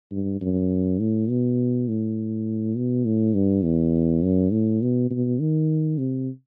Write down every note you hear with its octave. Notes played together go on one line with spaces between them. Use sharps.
G2
F#2
A2
B2
A2
B2
A2
G2
E2
F#2
A2
B2
B2
D#3
C3